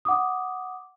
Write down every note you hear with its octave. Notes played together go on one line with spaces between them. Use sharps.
F#5 D6 D#6